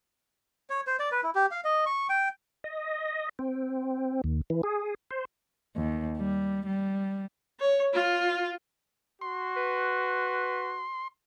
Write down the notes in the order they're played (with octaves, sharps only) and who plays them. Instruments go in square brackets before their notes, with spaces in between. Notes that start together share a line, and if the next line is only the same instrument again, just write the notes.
[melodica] C#5
C5
D5
B4
E4
G4
F5
D#5
C#6
G5
[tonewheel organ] D#5
C4
D#2
E3
G#4
C5
[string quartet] D#2
G3
G3
[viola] C#5
F4
[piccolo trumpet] F#4 [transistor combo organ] C6
[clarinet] B4